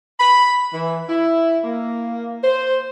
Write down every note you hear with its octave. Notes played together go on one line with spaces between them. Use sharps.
B5
E3
E4
A#3
C5